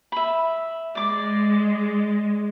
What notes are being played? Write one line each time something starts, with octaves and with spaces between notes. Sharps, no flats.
E5 B5
G#3 D5 D6